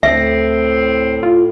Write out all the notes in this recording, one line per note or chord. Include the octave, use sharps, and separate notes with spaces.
D2 A2 C4 E5
F4